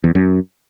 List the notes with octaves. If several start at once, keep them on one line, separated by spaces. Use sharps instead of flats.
E2
F#2